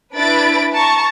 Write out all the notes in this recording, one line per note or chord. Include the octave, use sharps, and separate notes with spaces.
D4 E4 B4 B5 A6 D7
A5 A#5 C#6